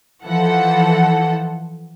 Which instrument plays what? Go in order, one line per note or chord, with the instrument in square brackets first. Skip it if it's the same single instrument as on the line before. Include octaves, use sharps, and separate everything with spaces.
[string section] E3 F3 A4 F#5